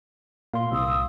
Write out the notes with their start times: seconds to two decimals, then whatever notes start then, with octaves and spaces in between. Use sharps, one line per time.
0.54 A#2 F5 C6
0.72 C2 D#6 E6